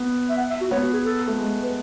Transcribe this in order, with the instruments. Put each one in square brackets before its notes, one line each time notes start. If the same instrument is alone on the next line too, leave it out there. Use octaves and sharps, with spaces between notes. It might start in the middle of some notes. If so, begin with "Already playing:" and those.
Already playing: [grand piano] B3
[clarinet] E5
F#5
E5
F#4
[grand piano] B3 [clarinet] C#5
[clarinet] F#4
G#4
A4
[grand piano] A3
G#3
[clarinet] B4